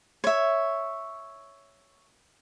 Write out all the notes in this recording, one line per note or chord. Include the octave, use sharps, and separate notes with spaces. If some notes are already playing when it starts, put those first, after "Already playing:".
C#5 E5